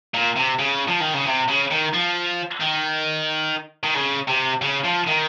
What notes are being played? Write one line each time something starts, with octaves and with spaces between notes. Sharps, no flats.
A#2
C3
C#3
F3
D#3
C#3
C3
C#3
D#3
F3
D#3
D#3
C#3
C3
C#3
F3
D#3